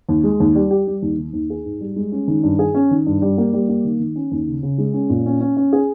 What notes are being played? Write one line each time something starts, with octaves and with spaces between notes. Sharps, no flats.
D#2
G#3
D#2
G3
G4
G3
D#2
D#3
D#2
G#4
G#2
G3
G#3
C#4
D#3
G2
G#4
C#4
D#3
G2
G3
A#3
G3
A#3
D#3
D#3
C#4
D#2
C#3
C#3
G#3
C#4
A#2
C#4
C#4
C#4
G#4